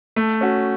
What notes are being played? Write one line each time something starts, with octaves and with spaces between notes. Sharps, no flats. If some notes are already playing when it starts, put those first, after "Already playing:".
A3
C#4 F#4